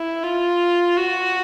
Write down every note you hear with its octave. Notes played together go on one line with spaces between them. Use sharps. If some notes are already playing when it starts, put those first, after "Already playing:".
Already playing: E4
F4
F#4